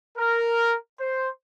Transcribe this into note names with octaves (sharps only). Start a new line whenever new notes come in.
A#4
C5